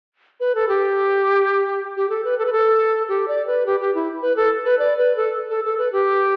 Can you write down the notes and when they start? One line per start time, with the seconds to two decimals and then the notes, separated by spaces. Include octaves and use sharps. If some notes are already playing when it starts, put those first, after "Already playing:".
0.40 B4
0.55 A4
0.69 G4
1.96 G4
2.09 A4
2.24 B4
2.38 A4
2.46 B4
2.52 A4
3.08 G4
3.28 D5
3.47 B4
3.66 G4
3.80 G4
3.95 E4
4.22 B4
4.36 A4
4.65 B4
4.79 D5
4.98 B4
5.16 A4
5.49 A4
5.64 A4
5.78 B4
5.92 G4